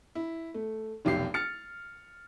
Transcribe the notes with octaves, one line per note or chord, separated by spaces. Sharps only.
E4
A3
F1 B1 G4 C7
F6 A6 C#7